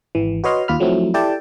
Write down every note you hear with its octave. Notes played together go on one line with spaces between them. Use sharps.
G#1 E3
F#4 B4 C#5 D#5 C6 F6
D#2 F4 B5 F6
F3 F#3 A3 C4 E4
E4 G4 A4 D5 G5 A5